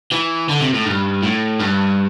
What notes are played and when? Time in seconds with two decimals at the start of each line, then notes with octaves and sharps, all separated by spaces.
0.12 E3
0.49 D3
0.61 C3
0.74 A2
0.85 G2
1.23 A2
1.59 G2